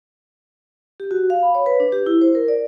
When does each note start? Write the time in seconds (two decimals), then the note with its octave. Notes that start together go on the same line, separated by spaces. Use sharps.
1.00 G4
1.11 F#4
1.30 F5
1.42 B5
1.55 C#5
1.66 B4
1.80 D4
1.92 G4
2.06 E4
2.21 C5
2.35 A#4
2.48 D5